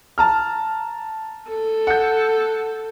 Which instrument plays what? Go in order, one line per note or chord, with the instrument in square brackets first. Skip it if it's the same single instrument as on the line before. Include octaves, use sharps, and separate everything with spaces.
[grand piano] A5 A#5 F6
[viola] A4
[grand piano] F#5 G6